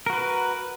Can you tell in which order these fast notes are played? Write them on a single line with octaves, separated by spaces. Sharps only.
A#4 F#4 B4